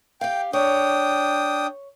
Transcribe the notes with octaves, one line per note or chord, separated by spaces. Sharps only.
G4 F5 G5
D4 C#5 G5 D#6